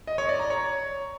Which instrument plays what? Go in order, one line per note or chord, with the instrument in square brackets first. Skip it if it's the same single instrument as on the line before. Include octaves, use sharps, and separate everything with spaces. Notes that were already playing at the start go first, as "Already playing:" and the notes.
[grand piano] D#5
C#5
D5
A#5
C#5